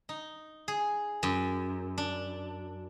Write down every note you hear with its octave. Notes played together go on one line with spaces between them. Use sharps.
D#4
G#4
F#2
D4